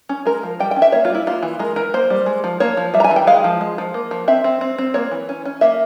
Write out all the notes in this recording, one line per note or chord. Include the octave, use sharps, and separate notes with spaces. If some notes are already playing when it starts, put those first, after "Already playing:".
C#4
G#3 A#4
F3
G3 G5
G5
C#4
E5
A#3 C#5
F4
G3
E4
A#3 F4
E3
G#3 A#4
E3 A#4
A#3 C5
G3
G#3
F3
A#3 C#5
F3
G3 E5
A#5
G#5
E3
G5
G#3 F5
F3
G#3
F3
A#3
F3
C4 E5
C4
C4
C4
A#3 C#5
E3
C#4
C#4
A#3 E5